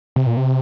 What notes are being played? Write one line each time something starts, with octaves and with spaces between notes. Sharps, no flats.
C3
A#2
C3